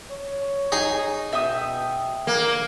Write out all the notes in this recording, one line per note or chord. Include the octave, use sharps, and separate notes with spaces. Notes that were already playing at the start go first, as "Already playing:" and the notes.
C#5
D#4 G#4 G#5
B2 E5 G5 D#6
D3 A#3